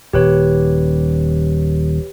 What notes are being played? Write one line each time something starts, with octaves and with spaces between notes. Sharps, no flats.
D#1 G4 B4 C#5